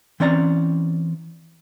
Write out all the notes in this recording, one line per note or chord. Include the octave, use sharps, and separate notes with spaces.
E3 C4 C#4 D5 A#5